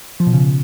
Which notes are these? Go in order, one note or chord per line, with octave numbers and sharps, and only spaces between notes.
F3
B2
C#3